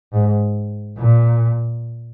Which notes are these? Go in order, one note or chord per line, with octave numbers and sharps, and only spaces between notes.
G#2
A#2